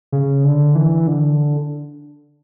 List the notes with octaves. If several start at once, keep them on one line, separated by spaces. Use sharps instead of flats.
C#3
D3
E3
D3